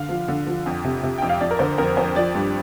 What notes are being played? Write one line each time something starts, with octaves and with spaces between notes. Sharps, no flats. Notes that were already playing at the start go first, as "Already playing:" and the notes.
Already playing: D3 F5
F3
D3
F3
F2
C3
C3
F2 G5
F5
F2 D5
A#4
D3 C5
F2 A#4
F2 C5
F3 D5
G2